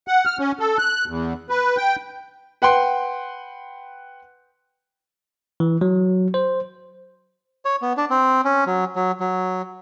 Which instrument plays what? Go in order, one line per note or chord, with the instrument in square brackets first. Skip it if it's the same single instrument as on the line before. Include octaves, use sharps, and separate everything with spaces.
[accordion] F#5
F6
C#4
A4
F#6
E2
B4
G5
[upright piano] B4 F#5 G5 C6
[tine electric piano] E3
F#3
C5
[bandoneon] C#5
B3
D4
C4
C#4
F#3
F#3
F#3